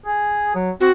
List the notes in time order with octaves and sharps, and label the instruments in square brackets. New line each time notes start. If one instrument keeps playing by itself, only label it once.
[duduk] G#4
F#3
[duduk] C4 [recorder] F#4